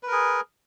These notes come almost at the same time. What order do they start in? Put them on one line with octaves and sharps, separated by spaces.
B4 A#4 G#4